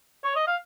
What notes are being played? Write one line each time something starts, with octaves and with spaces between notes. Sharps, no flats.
C#5
D#5
F5